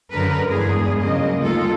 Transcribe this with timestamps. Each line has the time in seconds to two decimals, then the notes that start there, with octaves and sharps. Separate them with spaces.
0.11 F#2 D3 A#4 B4
0.50 E2 G2 G#3 G#4
1.00 C#3 F#3 G#3 A#3 D#5
1.40 D2 G3 G#3 D#4 F4 A4